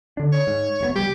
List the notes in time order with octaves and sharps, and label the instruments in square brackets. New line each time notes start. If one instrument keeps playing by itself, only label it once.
[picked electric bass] D3 D4
[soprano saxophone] C#5
[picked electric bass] G#2
F1 C3 B3
[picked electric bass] C#2 G3 [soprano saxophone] G4